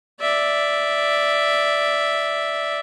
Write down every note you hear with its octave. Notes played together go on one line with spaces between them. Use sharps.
D5 E5